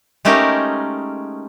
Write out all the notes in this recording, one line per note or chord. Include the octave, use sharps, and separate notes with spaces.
G#3 A3 C#4 D#4 G4 A#4